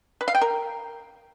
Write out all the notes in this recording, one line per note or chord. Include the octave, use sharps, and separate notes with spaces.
B4
F5
G5
A#4